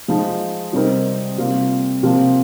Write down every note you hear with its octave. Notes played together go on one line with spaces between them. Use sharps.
F3 G#3 D#4
C3 G3 C4 D#4 A#4
C3 G3 A#3 F4
C3 F3 A#3 F4